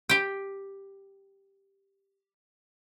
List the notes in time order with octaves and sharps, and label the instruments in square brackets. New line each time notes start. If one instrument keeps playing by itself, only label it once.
[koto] G4 G5